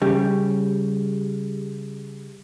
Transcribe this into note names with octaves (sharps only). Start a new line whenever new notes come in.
C#3 G3